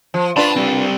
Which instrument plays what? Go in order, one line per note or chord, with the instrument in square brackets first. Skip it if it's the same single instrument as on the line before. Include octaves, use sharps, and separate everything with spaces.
[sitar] F3
[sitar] D4 F4 B4 [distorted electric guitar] A5 B5
[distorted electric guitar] G3 C4